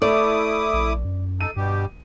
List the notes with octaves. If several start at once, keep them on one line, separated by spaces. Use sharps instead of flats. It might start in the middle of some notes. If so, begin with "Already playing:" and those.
A3 E4 D5 D6 D#6
A#1
F#2
D#4 A4 D#7
G2 B2 G3 G4